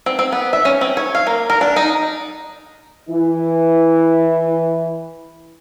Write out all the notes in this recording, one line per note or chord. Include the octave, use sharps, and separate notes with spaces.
C4
C4
B3
E5
C#4
C4
C#5
F5
A#3
A#4
D4
D#4
E3 E4